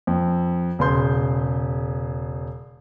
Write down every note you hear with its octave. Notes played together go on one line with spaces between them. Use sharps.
F2
E1 C#3 B4 C6 G6